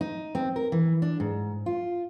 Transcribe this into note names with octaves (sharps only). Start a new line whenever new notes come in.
D#4
C4
A#4
E3
D4
G#2
F4